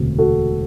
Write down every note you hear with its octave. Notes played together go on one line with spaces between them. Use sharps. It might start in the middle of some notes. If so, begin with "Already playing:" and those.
Already playing: E1 D2 C3
F#4 A4